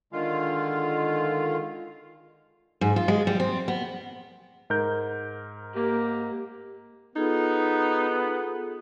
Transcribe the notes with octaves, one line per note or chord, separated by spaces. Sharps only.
D3 D#3 G#3 F4 F5
G#2
F4
G#3
G3
C4
B3
G#2 A#4 G6
A#3 G4
B3 D#4 F4 G#4 A4